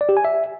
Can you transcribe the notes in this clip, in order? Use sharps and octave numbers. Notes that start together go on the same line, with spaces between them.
D5
G4
G#5
E5